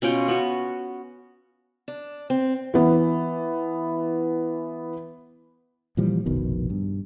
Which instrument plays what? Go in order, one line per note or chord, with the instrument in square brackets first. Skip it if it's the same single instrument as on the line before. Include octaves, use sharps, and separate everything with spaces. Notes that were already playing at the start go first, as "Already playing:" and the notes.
[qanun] B2 C#4 F4 G5
B3 C#4 F#4
[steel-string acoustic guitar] D4
C4
[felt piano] E3 B3
[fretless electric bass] A#2 E3 F3 G3
F1 A#1 B2 D#3
G2